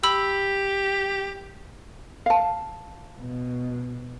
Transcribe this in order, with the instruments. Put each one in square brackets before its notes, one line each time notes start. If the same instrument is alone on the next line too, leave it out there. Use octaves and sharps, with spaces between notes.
[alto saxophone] G4 [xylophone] B5 E6
[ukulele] F5 A5
[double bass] B2